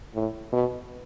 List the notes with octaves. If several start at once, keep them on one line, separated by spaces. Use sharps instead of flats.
A2
B2